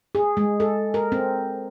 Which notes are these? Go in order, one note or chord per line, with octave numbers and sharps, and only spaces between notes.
G#4
G#3
A4
A#4
C4